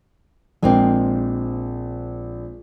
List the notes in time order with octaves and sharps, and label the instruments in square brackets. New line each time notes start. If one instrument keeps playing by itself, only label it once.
[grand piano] A#1 [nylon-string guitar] G#3 A#3 C4